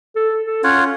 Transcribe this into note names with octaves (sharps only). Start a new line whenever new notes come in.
A4
A4
C#4 F4 C#5 F#5